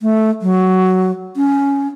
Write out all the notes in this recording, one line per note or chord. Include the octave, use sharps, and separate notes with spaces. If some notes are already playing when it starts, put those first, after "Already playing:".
A3
F#3
C#4